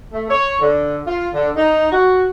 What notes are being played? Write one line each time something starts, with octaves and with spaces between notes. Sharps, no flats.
A3
C#5
D3
F4
D3
D#4
F#4